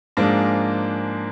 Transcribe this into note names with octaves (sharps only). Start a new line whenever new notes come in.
G#2 F3 G#3 A#3 D4